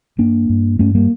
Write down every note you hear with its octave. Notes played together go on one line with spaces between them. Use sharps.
G2 A#3 D4
G2
G2 A3 C#4
G3 A#3